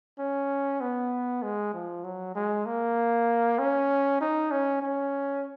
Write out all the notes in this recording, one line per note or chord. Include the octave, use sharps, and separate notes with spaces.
C#4
B3
G#3
F3
F#3
G#3
A#3
C#4
D#4
C#4
C#4